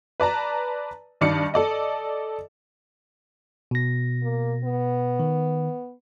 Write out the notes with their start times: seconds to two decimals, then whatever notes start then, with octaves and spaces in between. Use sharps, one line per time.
0.20 B4 D5 A5 A#5
1.21 G2 D#3 D5 D#5 C#7
1.54 A4 D5 D#5
3.71 B2 A#6
4.23 A#3
4.64 B3
5.20 D#3